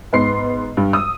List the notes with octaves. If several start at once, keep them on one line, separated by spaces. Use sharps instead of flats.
G#2 B3 C6 C7
G2
D#6 E6